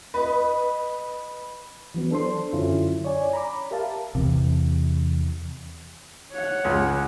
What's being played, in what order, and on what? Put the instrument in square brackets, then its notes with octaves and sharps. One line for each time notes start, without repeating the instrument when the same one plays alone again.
[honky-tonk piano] B4 D#5
[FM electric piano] E3 F#3 B3
D4 A4 C5 C6
F#2 D3 F#3 C#4 E4 F4
C#5 D5 G#5
A#5 B5 D6
G4 A#4 E5 F5 A5
[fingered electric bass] E2 C3
[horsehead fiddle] C#5 F#5
[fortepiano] C#2